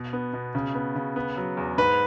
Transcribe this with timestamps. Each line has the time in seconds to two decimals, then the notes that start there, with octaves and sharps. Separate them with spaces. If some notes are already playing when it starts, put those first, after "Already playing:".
Already playing: B2
0.13 B3
0.33 B2
0.55 C#3
0.75 B3
0.96 C#3
1.16 B3
1.37 F#3
1.57 E2
1.78 G#2 B4